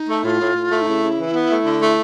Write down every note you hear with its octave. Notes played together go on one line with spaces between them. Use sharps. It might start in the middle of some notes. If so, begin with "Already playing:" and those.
Already playing: D#4
A3
A2 F4
A2
A2
A3
D#4
C#3 E4
C#3
E3
B3
A3
D3
A3